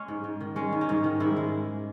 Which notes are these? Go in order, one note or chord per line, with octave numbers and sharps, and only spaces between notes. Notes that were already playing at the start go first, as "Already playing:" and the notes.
Already playing: G#3 C#4
G#2
G#2
D#3
G#3 C#4
G#2
C#4
G#2 D#4
D#3
G#2 E4
G#3